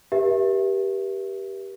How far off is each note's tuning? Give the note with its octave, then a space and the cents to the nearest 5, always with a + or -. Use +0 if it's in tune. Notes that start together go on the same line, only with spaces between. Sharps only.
G4 +0 A#4 +45 E5 +0